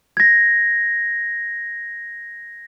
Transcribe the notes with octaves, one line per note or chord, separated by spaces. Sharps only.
G#6 A#6